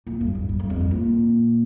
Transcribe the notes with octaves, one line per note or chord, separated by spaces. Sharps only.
A#2
G2
G2
G2
G2
F2
G2
A#2